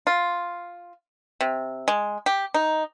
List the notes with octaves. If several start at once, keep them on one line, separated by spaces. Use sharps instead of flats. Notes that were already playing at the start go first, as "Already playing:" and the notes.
F4
C3
G#3
G4
D#4